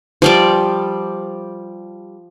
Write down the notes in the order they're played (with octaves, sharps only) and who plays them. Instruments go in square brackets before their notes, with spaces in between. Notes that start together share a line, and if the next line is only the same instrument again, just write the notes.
[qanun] F3 G3 D5